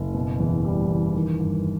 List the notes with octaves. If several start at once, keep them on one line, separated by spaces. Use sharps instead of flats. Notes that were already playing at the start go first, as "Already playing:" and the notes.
Already playing: F#1
B2
E2
G3
E2
D#3
G2